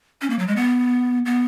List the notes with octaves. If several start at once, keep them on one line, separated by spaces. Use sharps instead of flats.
C#4
A#3
F#3
G#3
B3
B3